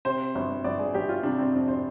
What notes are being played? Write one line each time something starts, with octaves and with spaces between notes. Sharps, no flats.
C3 C5
G1
G1 D5
G#4
G1 G4
F4
C3 D4
C4
F2 D4
C5